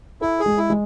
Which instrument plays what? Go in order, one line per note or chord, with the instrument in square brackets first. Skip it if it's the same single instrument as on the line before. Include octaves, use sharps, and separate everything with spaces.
[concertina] E4 [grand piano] A4
[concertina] G#4
[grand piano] G#3
[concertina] E4
[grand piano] G#3